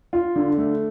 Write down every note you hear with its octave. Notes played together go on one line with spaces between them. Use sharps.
F4
D3
A3